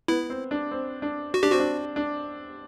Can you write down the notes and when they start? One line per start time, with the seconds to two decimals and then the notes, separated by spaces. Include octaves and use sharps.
0.08 B3 E4
0.30 C4
0.51 D4
0.71 C4
1.02 D4
1.34 F#4
1.43 D4 G4
1.52 C4 F#4
1.60 D4
1.96 D4